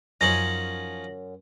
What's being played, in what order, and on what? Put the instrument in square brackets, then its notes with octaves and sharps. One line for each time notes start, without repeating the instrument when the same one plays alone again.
[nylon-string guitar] F#2 C#5 [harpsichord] F3 C#4 D#4 [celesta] A#6 F#7